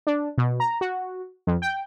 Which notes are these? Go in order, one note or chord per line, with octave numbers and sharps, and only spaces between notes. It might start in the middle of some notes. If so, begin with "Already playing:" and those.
D4
B2
A#5
F#4
F2
G5